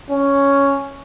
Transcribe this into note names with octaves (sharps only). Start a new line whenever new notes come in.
C#4